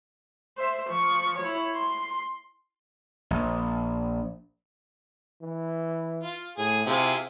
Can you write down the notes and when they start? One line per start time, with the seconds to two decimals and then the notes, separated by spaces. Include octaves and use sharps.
0.58 C5 E5
0.90 F3 C#6
1.38 E4 C#5
1.75 C6
3.31 A#1
5.42 E3
6.23 F4
6.58 A2 G#4
6.86 C3 E4 F4 G#4